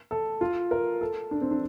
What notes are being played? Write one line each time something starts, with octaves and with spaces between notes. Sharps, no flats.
A4
F4
A#4
A4
D4
C4
D4